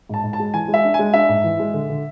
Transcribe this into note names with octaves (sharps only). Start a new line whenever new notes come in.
G#2 A5
G#2
A5
G#3
E3 G#5
G#3
E5
D4
G#3 G#5
D4 E5
G#2
E3
G#3
D3
D3